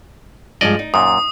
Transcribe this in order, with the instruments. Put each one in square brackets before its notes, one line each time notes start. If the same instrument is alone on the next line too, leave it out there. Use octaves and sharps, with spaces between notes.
[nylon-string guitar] G2 F3 G#3 [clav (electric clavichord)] D5 D#5
[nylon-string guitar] D#4
[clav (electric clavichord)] F#2 A#2 [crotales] D#6